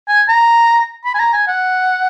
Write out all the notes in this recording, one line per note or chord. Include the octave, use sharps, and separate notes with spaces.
G#5
A#5
B5
G#5
A#5
G#5
F#5